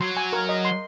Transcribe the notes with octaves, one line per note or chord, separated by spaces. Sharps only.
F#3 C6
G#5
A#4
D#5
C6